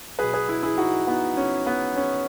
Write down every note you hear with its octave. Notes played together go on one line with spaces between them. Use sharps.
B2 F#3 G#4 B4
G#4 B4
E4 G#4
E4 G#4
D#4 F#4
B3 D#4
C#4
B3
C#4